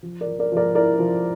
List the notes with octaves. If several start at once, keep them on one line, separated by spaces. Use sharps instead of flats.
F3
A#4 D5
F3
A#4 D5
F3 A#4 D5
E4 A#4 D5
F3